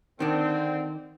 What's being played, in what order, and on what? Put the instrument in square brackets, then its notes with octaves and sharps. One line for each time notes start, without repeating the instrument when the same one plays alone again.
[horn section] D3 C4 [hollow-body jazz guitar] D#3 D4